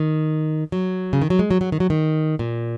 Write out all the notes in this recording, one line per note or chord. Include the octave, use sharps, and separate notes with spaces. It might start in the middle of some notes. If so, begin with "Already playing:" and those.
Already playing: D#3
F#3
C#3
D#3
F#3
G#3
F#3
F#3
D#3
F#3
D#3
A#2